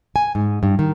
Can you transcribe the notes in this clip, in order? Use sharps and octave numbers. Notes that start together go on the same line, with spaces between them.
G#5
G#2
G2
D#3